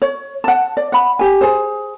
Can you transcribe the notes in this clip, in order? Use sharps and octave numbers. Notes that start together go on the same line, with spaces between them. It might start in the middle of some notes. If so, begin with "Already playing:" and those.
C#5
F#5 A5
D5
F#5 B5
G4 G#5
G#4 C5